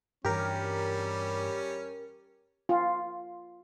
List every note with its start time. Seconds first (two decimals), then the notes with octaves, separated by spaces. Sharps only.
0.25 G2 E3 G3 C#4 G4 A#4
2.69 F4